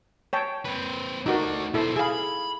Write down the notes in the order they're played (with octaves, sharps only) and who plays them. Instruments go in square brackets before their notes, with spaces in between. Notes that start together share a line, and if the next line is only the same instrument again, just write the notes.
[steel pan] C#5 G5 A5
[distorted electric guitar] C4 B4
[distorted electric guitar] A3 D4 [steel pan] D#4 F#4 A#4
[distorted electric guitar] B2 C5 [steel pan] E4 A4
[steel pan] G#4 F5 [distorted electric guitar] E5 B5